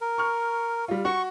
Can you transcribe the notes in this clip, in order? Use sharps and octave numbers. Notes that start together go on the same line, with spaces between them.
A#4
C#6 F6
G3 F4
F#4 C#6